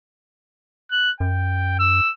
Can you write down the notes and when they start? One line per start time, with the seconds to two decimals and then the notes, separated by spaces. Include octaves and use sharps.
0.91 F#6
1.20 F#2 G5
1.79 E6